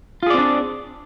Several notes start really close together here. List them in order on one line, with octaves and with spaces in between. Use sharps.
F4 G#4 D5 C4 D4